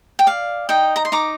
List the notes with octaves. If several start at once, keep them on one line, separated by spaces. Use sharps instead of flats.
G5
D5 F5
D#4 D#5 G5
A#5
C6
D#4 A#5 D6